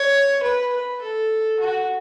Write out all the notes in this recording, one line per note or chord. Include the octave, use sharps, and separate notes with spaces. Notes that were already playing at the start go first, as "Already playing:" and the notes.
Already playing: C#5
B4
B4
A4
F#4